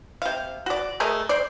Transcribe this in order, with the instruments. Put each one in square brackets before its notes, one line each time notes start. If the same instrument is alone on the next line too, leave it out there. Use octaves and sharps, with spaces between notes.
[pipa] C3 F5
F#4 D5
A3 G#4 A#4 D#5
C5 D5